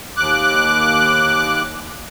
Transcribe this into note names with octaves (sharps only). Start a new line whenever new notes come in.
D#2 D6 F#6